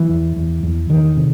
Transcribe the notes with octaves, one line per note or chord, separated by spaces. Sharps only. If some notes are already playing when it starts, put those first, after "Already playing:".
Already playing: E3
E2
E2
E2
E2 D#3
C3